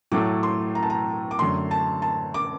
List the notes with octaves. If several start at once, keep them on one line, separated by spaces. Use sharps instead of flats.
A2 F#3 A3 D6
C6
A#5
A5
A#5
D6
F#2 D3 A3 C6
A5
A5
D6